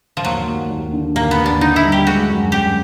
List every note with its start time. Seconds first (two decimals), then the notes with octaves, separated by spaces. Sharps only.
0.17 F3
0.25 D#2 F#3
0.48 D#2
0.70 D#2
0.93 D3
1.15 D#2 A#3
1.31 B3
1.38 D#2
1.46 D4
1.61 D3 D#4
1.76 E4
1.84 G3
1.92 G4
2.07 G#3 F#4
2.29 F#2
2.52 F#2 G4